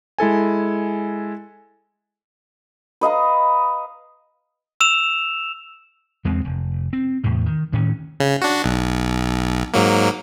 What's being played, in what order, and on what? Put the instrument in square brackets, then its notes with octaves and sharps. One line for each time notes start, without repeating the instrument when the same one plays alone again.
[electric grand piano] G#3 E4 A4 G#5
[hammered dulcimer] B4 D#5 F5 A#5
[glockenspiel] E6 E7 F7
[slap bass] E2 G#3 C4
F1
C4
E2 A2 C3
D#3
D2 A2 D#3 C#4
[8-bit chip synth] C#3
D4 F#4
B1
G#2 F#3 A#3